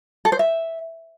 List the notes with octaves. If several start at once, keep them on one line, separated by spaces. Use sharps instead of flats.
A4
C5
E5